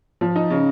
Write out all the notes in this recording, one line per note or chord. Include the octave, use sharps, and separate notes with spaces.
F3
D#4
C#3